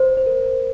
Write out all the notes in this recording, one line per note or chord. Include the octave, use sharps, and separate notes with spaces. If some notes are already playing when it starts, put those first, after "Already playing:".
Already playing: C5
C5
A#4